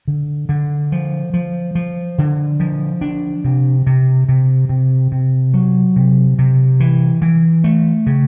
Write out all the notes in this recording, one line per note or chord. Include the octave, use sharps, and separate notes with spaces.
D3
D3
F3
F3
F3
D3
F3
D4
C3
C3
C3
C3
C3
F#3
C3
C3
E3
E3
A3
C#3